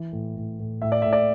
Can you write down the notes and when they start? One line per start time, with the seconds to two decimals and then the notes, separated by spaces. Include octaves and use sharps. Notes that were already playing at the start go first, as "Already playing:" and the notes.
Already playing: E3
0.12 A2
0.37 A2
0.59 A2
0.82 A2 E5
0.92 D5
1.02 A2 E5
1.13 D5